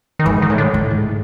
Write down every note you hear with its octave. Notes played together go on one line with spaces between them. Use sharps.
D#3
G#2 E3
D#3
A2
D3
A2
G#2